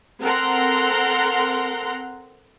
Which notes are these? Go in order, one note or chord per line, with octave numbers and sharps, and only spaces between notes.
C4 A4 A#4 F#5 A#5 C6